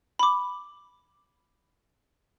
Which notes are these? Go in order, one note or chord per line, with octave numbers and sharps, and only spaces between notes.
B5 D6